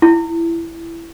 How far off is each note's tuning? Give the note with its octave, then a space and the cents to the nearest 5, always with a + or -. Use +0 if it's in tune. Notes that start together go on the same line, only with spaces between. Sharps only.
E4 +10